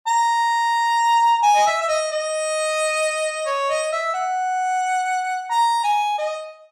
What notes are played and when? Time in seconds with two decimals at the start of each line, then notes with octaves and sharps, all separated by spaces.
0.08 A#5
1.43 G#5
1.55 D#5
1.66 E5
1.81 E5
1.88 D#5
2.12 D#5
3.46 C#5
3.70 D#5
3.92 E5
4.14 F#5
5.51 A#5
5.84 G#5
6.18 D#5